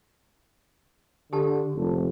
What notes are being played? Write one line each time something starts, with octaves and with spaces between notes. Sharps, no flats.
D3 G4 A5
F1 C#2 D3 A4